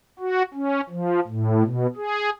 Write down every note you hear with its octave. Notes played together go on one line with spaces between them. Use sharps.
F#4
C#4
F3
A2
B2
G#4